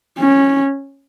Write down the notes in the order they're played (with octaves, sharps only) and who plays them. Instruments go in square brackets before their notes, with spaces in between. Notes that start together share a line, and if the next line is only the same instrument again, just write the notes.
[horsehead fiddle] C#4